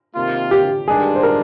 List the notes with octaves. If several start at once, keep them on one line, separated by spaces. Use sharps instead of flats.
C3 D#3 A#3 F4
G4
G2 D#3 G#3 D4 G#4
C5
A#4